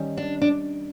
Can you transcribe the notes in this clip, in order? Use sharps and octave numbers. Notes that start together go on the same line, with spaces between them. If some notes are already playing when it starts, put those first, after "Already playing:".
Already playing: D#3 G3 C#4
D4
D4